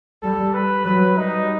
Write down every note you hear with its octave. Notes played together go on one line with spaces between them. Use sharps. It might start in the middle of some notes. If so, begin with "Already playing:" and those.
G3 A4
B4
F#3 B4
G3 D#4